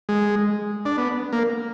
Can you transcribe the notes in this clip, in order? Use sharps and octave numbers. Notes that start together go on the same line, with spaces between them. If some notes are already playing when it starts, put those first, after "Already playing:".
G#3
D4
B3
A#3